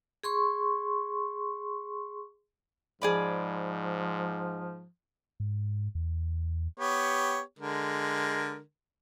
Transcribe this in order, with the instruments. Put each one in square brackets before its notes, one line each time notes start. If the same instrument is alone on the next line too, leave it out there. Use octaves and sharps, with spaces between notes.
[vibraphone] G#4 C6 C#6
[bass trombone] G#2 [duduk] F3 [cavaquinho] G#4 D5 B5
[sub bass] G#2
E2
[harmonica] B3 G4 C#5
D3 G#3 A#4